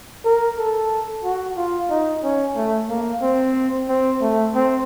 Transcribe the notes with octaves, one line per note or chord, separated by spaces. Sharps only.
A#4
A4
F#4
F4
D#4
C#4
A3
A#3
C4
C4
A3
C4